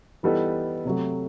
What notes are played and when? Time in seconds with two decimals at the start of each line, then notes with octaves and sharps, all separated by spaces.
0.23 E3 G3 B3 D#4 A4
0.85 C3 F#3 A3